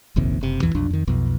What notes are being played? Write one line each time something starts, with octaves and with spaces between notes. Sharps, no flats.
F1 A#1 D#2 C3
F#1 C3
A1 E2 E3
B1 F2 D4
F2 D#3
B1 F2 B2